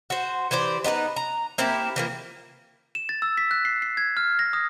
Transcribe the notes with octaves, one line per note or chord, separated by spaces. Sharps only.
F#4 C5
E3 G4 C5 D5
B3 D#4 G4 B4
A#5
A#3 C4 E4 G4
E3 F3 A#3
E7
A6
E6
B6
F#6
C7
C7
G#6
F6
A#6
D#6